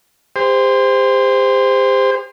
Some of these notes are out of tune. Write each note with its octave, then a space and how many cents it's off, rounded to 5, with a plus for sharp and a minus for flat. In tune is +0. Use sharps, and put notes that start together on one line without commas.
G4 +40 C5 -15